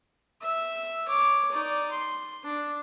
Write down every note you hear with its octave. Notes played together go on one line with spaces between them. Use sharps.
E5
C#5 D6
D#4 D5
C6
D4